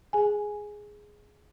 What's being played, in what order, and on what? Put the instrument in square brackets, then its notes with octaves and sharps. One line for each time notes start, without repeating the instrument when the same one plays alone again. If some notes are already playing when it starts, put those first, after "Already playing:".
[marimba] G#4 G#5